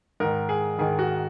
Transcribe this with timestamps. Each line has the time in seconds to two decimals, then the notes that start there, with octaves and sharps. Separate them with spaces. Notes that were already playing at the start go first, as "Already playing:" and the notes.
0.20 G#2 D#3 A#4
0.49 G#4
0.79 G#2 D#3 G#4
0.99 F#4